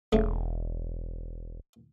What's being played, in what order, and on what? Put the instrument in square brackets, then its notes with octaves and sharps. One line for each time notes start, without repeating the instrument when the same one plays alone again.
[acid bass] E1 [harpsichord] C#3 A3